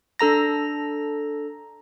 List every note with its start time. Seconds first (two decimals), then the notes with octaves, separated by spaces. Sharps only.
0.19 D4 A4 A#5 A#6